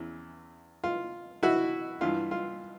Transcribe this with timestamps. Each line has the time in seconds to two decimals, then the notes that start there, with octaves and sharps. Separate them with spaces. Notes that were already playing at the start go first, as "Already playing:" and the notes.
Already playing: E2 C#3 E3
0.84 F4
1.43 E4 F#4
2.01 G2 E3 F4
2.31 F4